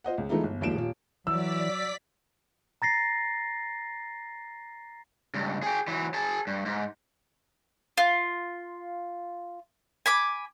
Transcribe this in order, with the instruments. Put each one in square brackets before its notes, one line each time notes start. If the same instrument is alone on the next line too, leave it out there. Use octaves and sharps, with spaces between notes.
[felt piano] F4 C5 D#5 F#5
C#2
E3 G#3 A3 B3 D#4 F4
G1
F#1 D#2 F3 G#3 D7 E7
D#1 F4
[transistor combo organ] E3 [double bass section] F#3 [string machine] D5 B6 [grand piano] E6
[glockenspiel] A#5 A6 A#6 C7
[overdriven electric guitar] C#2 G2
G#4 G5
E3 F#3
G#4 A5
G2
G#2
[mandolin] F4
G#5 B5 D6